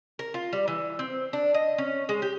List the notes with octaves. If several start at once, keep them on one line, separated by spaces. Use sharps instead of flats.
A#4
F4
G3
E3
C4
D4
D#5
C#4
G#3
G4